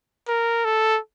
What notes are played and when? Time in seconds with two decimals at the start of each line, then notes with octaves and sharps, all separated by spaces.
0.28 A#4
0.65 A4